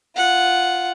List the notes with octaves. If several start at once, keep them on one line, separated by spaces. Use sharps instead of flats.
F4 F#5